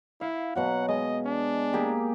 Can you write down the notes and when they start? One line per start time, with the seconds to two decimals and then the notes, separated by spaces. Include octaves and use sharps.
0.21 E4 F5
0.55 B2 F#3 F#4 F#5
0.88 G#3 D#5
1.26 D4
1.73 A#3 G4 G#4